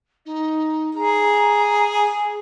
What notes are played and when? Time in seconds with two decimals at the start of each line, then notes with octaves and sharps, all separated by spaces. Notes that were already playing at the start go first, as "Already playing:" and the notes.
0.25 D#4
0.95 G#4 A#5